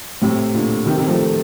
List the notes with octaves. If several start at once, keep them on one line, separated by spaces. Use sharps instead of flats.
A2 C3
A#2 D3
C3 D#3
C3 D#3
F3 A3